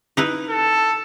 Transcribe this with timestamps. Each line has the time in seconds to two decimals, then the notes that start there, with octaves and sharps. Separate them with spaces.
0.17 D#4 E4 B4
0.49 A4